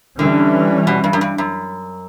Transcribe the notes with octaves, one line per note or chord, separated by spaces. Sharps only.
D3 E3 G3 C#4
B2
G2
F#2
G2
F#2